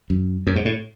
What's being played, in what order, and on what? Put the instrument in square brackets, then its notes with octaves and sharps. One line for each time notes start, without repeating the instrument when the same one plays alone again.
[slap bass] F#2
F#2
G#2
A2